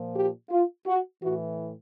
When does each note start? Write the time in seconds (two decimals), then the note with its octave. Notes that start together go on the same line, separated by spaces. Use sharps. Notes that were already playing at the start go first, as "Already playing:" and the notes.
Already playing: A#2 F3
0.15 G4
0.50 F4
0.86 F#4
1.21 A2 E3 F#4